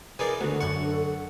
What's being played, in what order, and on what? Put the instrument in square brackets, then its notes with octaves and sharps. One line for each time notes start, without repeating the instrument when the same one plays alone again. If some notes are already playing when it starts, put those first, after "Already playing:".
[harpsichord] E3 D#4 D5 [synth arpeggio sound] G#4 [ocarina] A#4
[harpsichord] D2 [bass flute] D3 [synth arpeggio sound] B3 F#4 [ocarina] A4
[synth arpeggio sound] F#2 C#6 [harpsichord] F#5